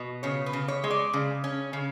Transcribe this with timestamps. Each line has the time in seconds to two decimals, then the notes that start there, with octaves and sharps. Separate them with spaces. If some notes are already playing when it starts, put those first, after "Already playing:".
Already playing: B2
0.23 C#3 C#5
0.46 B4
0.53 C#3
0.68 C#5
0.84 G#3
0.90 D5
1.13 C#3
1.44 C#4
1.73 C#3